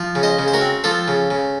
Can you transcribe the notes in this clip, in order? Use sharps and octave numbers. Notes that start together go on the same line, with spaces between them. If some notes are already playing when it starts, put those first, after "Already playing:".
Already playing: F3
C#3
C5 D#5
C#3
C5
F#4 A#4
C4
F3 A4 C5
C#3
C#3